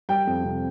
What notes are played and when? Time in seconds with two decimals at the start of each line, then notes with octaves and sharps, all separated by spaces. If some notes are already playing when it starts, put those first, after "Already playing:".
0.09 G3 G5
0.27 F2
0.44 C3